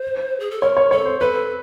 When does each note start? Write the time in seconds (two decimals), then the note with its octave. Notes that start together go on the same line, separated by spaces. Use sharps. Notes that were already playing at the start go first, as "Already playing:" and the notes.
Already playing: C5
0.40 G#4
0.51 A4
0.61 A#4 C#5
0.77 C#5
0.91 A4 C#5
1.05 C5
1.20 A4 B4